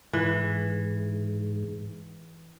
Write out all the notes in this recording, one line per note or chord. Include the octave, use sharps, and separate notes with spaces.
G#2 E3